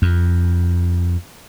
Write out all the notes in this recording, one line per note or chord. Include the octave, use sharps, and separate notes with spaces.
F2